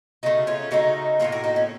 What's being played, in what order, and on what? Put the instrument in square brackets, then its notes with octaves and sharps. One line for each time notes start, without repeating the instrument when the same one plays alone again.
[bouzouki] C#3 A3 D#4 F#4
C#4 F4
C#3 A3 D#4 F#4
A2 F3 A#3 F4 A4
F#4 A#4
D#4 F#4
C#4